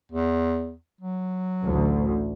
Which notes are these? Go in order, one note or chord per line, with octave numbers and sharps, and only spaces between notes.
E2
F#3
A1 D2